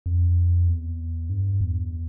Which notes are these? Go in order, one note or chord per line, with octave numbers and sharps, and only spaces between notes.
F2
E2
G2
E2